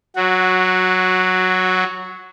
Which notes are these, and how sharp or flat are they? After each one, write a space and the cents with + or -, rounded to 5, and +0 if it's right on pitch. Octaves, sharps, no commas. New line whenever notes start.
F#3 +0 F#4 -15